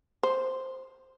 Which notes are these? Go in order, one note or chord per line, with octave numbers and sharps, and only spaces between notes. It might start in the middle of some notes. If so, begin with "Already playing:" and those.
C5